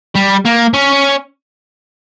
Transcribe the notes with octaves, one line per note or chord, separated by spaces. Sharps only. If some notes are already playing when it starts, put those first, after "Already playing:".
G3
A#3
C#4